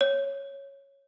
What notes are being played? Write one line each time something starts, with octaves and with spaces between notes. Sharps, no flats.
C#5